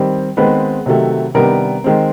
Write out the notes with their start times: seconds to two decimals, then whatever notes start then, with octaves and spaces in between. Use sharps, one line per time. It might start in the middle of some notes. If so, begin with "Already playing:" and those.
Already playing: D#3 G3 C4
0.37 D#3 G#3 B3 C4 B4
0.86 C3 D#3 F#3 A3
1.35 C3 D#3 G3 B3 D4 A#4
1.84 D#3 G#3 C4